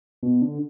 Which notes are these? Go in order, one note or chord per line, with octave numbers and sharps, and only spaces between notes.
B2
D3